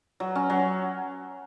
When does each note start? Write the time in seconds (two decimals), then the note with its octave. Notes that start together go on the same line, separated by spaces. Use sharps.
0.20 F#3
0.35 C#4
0.50 F#3